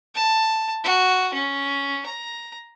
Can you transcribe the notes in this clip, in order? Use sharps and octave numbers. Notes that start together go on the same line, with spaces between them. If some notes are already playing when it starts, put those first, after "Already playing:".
A5
F#4
C#4
A#5